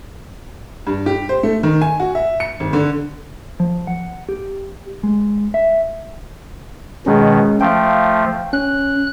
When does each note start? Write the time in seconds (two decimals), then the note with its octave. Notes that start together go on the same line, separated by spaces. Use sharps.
0.87 G2
1.06 G4
1.29 C5
1.43 A3
1.63 D#3
1.82 G#5
2.00 F#4
2.15 E5
2.40 C#7
2.60 G#1
2.73 D3
3.60 F3
3.87 F#5
4.29 G4
5.03 G#3
5.54 E5
7.06 B2 D#3 G#3 C#4
7.61 F3 A3 F5 G5
8.53 C#4 F#6